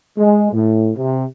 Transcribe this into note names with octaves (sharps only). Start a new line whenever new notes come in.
G#3
A2
C3